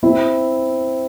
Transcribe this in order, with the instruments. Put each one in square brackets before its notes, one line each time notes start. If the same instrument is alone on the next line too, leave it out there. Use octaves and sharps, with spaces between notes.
[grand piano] C4 E4